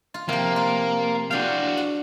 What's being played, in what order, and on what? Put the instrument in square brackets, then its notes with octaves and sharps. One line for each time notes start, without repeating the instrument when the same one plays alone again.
[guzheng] F4
[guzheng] C3 F3 [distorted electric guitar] A#3
[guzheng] F4
[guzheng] D4 G5 [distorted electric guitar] F#4 F5
[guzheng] F#5